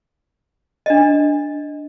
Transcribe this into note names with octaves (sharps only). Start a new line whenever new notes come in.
D4 D#5